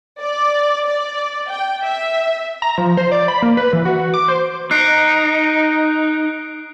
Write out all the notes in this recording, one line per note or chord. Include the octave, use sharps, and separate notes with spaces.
D5
D5
G5
E5
A#5
F3
C5
D5
B5
A#3
B4
E3
F#4
D6
C5
D#4 F#6 C7 D7